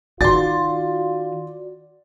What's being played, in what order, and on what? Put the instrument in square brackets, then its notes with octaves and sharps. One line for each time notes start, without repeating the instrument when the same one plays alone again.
[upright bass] D#3 [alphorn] F4 [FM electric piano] F#4 D5 [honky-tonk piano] C6 A6